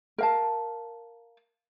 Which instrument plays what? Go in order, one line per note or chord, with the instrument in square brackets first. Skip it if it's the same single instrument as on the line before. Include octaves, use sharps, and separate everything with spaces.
[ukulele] A#4 F5 A5